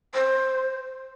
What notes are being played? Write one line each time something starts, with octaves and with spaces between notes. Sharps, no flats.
C5